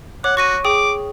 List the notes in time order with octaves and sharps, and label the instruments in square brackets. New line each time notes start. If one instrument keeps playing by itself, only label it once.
[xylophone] C#5 D6 [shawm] F#5
[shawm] F#4 [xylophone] C#6 A#6 D#7
[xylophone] G#4 G5 D#6 [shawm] D6